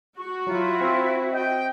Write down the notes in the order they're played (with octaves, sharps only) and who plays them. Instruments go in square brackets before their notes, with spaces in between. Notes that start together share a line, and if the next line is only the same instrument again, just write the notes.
[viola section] F#4 [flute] C#6
[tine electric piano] F#3 [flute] E4 [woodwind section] F4
[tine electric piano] C4
[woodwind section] D#5 G5